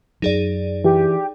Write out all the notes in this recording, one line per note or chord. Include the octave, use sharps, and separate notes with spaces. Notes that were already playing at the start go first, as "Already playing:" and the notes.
F#2 F#3 D#4 G#4 D5
E3 G4